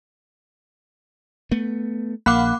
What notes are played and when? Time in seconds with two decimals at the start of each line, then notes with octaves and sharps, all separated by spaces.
1.51 A3 B3
2.26 A#1 A#3 F5 F#5 B5 D6 F#6